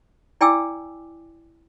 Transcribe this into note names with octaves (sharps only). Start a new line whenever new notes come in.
E4 D5 G5 G#5 D6 E6